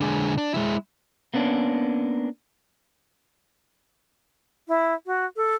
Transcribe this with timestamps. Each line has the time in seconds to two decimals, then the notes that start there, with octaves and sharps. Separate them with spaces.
0.01 D3 G#3
0.38 D4
0.54 G#3 E4
1.34 A#3 B3 C#4 D4
4.68 E4
5.06 F#4
5.36 A4